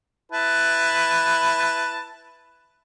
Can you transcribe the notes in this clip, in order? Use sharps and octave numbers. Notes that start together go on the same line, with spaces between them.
E4 B4 A5